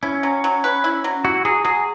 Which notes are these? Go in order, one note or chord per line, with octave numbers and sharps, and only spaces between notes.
C#4 E4
F#3
F#3
B4
E4
F#3
E4 F#4
F#3 G#4
F#3 G#4